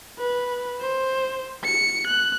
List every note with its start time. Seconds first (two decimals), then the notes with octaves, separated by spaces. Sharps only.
0.19 B4
0.81 C5
1.64 C#7
2.07 F#6